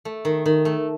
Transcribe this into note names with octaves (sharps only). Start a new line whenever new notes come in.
A3
D#3
D#3
A3